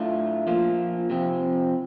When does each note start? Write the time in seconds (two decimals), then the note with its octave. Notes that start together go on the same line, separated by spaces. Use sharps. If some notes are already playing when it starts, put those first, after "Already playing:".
Already playing: A2 A3 D4 F4
0.47 A#2 F3 A#3 F4
1.10 C3 F3 C4